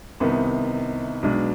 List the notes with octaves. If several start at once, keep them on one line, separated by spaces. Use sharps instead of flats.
C2 C3 D#3 B3 D#4
B1 B2 G#3 D4